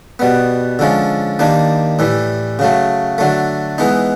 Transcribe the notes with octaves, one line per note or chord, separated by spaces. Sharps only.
B2 G3 B3
D3 F3 G#3 C#4
D#3 G3 A#3 D4
A2 E3 G3
C#3 F#3 A3
D3 F#3 A3
E3 G#3 B3 D#4